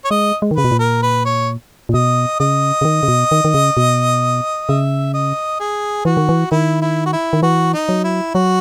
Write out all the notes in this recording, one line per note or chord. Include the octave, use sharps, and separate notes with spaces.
C#5
G#3 D#5
G#3
D#3
C#3 B4
B2
A#2
A#4
B4
C#5
A#2
B2 D#5
C#3 D#5
C#3
D#3
C#3
B2
D#3
D#3
C#3
B2
C#3 E5
D#5
G#4
E3 F#4
D#3
E3
D#3 E4
E4
F#4
E4
D#3
E3 F#4
D#4
F#3
E4
F#3 F#4